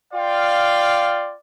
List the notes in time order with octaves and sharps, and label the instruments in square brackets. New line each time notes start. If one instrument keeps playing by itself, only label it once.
[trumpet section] F4 D5 F5 G5